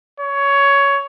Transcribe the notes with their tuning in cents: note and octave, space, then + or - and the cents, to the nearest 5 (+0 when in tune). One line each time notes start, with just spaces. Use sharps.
C#5 +15